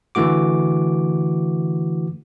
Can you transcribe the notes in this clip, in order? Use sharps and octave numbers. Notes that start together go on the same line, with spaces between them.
D3 E3 A3 F#4 D6